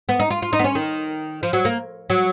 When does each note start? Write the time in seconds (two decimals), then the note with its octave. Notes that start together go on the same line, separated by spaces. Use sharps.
0.09 B3
0.19 D#4
0.30 F4
0.42 F4
0.53 D#4
0.59 B3
0.64 C#4
0.75 D#3
1.43 F3
1.53 F#3
1.65 A#3
2.10 F#3